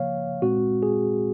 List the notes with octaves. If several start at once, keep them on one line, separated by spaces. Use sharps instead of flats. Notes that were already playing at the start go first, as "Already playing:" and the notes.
Already playing: C#3 F3 A#3 C#5 F5
A#2 G#3 C4 F#4
G#4